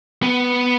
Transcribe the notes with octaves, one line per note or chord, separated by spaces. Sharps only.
B3